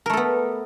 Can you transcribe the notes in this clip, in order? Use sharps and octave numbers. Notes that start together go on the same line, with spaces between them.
A3 B3 A4 A#4